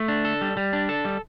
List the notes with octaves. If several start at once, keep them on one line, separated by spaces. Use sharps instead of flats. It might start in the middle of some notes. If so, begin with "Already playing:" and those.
Already playing: A3
D4
A4
G3
G3
D4
A4
G3